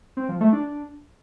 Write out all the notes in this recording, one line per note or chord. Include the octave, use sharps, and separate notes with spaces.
C4
F3
A3
D4